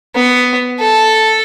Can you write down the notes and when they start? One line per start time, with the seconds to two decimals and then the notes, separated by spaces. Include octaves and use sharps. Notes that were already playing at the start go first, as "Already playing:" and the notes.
0.15 B3
0.80 A4